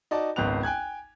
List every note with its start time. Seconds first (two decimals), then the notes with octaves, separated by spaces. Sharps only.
0.11 D#4 F#4 D5 A5
0.36 G#1 C#2 B3 F#6 F7
0.63 G5 G#5 F#6 G#6